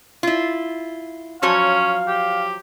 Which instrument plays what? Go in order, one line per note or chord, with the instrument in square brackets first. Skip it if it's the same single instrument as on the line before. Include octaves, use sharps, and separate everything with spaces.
[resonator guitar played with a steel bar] E4 F4
[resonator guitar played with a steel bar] F3 F#3 C#5 [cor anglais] C#4 [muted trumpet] F5
[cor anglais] G4